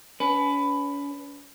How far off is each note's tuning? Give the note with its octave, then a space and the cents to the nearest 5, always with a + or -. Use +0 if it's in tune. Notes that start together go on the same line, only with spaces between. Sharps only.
C#4 +40 B4 +10